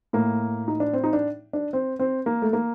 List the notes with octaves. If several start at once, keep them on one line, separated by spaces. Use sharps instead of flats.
A2 A#3
D#4
D4
C4
D#4
D4
D4
C4
C4
A#3
A3
A#3